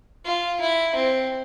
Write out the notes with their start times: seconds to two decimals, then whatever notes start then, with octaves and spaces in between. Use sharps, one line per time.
0.25 F4
0.60 E4
0.95 C4